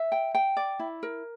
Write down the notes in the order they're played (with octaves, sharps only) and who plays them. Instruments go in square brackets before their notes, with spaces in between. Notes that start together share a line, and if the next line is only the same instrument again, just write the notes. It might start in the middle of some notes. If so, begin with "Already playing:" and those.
Already playing: [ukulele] E5
G5
G5
D5
E4
A#4